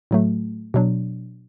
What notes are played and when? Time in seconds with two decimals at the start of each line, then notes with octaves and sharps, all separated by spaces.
0.11 A2 F#3 A3
0.74 B2 F#3 D4